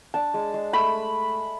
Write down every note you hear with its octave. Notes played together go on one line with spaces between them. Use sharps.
D4 A5
G#3
G#3
A3 B5